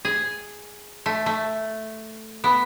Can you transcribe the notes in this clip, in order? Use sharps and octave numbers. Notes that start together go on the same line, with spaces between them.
G#4
A3
A3
B3